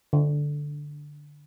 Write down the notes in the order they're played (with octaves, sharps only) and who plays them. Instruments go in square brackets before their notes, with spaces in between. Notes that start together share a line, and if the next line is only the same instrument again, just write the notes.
[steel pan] D3